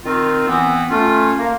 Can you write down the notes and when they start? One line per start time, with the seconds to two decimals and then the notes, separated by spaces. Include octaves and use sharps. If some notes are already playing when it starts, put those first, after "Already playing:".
0.04 D#3 C4 F4
0.47 E3 B3 C4
0.90 A3 C#4 F4
1.39 A#3